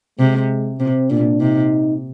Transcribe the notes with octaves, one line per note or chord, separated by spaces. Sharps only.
C3 G#3
C3 C4
A#2 D4
C3 D#4